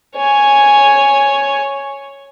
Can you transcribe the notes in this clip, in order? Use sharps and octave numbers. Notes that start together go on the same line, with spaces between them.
C#5 G#5